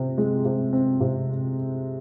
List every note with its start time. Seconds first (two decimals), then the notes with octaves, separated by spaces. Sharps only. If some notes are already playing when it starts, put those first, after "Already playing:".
Already playing: C3 C4
0.18 G#3
0.45 C3
0.73 C4
1.01 C3